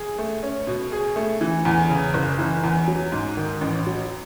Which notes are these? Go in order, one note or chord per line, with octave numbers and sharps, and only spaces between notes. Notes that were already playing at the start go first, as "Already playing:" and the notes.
Already playing: G#4
A3
C#4
B2
G#4
A3
E3
E2
C#3
F#1
E3
E2
F#3
G#2
D#3
A1
F#3